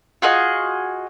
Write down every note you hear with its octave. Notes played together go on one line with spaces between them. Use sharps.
F4 F#4 G#4 D#5